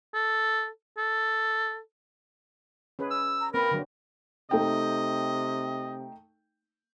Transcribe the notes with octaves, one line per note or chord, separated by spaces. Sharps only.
A4
A4
C#4 G#4 B4
E6
A#5
A#3 C4 A#4 B4 B5
D3 F#3
C3 A3 D#4 D#5 G5